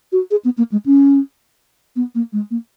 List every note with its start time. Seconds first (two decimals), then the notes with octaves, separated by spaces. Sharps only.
0.12 F#4
0.31 G#4
0.45 B3
0.58 A#3
0.72 G#3
0.86 C#4
1.96 B3
2.15 A#3
2.33 G#3
2.51 A#3